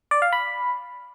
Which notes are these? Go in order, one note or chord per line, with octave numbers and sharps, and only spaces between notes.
D5
F5
B5